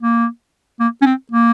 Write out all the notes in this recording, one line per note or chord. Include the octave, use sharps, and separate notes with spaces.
A#3
A#3
C#4
C4
A#3